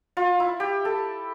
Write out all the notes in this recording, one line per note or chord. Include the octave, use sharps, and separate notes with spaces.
F4
E4
G4
A4